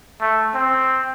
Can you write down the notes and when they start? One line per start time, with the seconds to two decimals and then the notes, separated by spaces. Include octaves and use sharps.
0.21 A3
0.55 C4